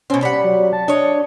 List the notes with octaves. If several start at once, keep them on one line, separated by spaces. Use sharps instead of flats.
B2 C4 C#4
G3 F#5 B5
F#3
A5
D4 C#5 D#5